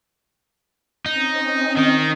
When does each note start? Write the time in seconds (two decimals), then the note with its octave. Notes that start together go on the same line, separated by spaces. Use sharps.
1.06 C4 C#4 D#4 D#5
1.77 D#3 D#4